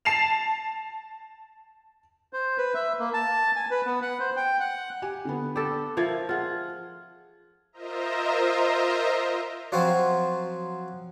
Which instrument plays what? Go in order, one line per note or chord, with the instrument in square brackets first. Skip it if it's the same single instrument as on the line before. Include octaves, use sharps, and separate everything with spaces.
[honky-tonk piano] A5 C7 E7 F7
[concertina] C5
B4
E5
A#3
A5
G#5
B4
B3
F#5
C5
G5
F#5
[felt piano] G4 G#5
D3 B3
[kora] G4 A4
[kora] F3 [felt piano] A#4 E5 G#6
[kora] F4 [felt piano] G#4 F#5
[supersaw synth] F4 A#4 C5 D#5 E5 A#5
[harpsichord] F3 F#3 C4 F4 F#4 C5